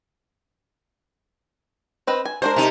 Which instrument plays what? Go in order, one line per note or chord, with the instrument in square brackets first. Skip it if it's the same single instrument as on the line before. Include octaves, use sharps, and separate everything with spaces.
[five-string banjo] C4 B4 D#5
G#5
[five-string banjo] G#3 D4 A#4 [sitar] C5
[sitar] C3 D#4